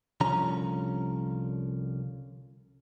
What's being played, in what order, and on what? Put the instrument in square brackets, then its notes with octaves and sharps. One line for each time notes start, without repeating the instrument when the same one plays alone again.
[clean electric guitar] C2 D3 F3 C#4 A#5